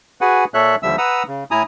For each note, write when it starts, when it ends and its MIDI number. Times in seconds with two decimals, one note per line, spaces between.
0.21 0.45 66
0.21 0.45 68
0.21 0.45 71
0.21 0.45 78
0.21 0.45 80
0.54 0.76 46
0.54 0.76 69
0.54 0.76 73
0.54 0.76 76
0.54 0.76 90
0.83 0.96 39
0.83 0.96 50
0.83 0.96 53
0.83 0.96 55
0.83 0.96 76
0.83 0.96 88
0.98 1.23 71
0.98 1.23 78
0.98 1.23 82
0.98 1.23 87
0.98 1.23 88
1.27 1.44 49
1.51 1.63 45
1.51 1.63 64
1.51 1.63 80
1.51 1.63 82
1.51 1.63 87